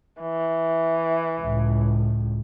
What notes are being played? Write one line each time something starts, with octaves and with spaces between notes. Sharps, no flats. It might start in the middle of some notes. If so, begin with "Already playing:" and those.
E3
C#2 A2